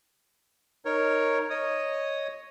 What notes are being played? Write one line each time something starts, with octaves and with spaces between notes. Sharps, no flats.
D#4 A#4 C#5
C#5 D#5 D#6